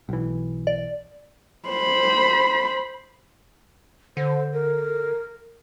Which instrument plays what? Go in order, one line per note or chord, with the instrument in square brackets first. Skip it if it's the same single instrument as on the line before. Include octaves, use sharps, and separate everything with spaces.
[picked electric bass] B1 E3
[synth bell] D5
[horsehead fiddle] C5 B5
[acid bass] D3 [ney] C5
[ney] A#4